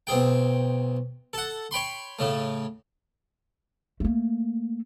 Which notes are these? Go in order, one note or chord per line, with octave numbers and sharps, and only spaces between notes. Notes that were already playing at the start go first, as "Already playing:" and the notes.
B1 C4 G#4 G5
A4 F#5
C#5 G5 B5 C6
A2 C#3 A3
A3 A#3